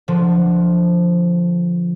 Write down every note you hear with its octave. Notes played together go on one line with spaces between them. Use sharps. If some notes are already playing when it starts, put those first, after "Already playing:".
D3 F3